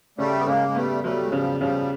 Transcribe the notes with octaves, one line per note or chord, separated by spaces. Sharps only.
C#3 G3 A3
B3
C#3 G#3 A#3
G#3
G3 A3 B3
F#3 G3 A3
G#3
C#3 F3 G3
C#3 F3 G3